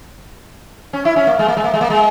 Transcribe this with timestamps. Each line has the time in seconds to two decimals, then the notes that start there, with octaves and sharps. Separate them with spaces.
0.93 C#4
1.05 E4
1.16 C#4
1.27 A#3
1.39 G#3
1.48 A#3
1.57 G#3
1.64 A#3
1.74 G#3
1.81 A#3
1.90 G#3